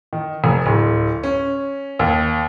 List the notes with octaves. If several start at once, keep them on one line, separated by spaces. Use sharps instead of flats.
D#3
F1
D1
C#4
D#2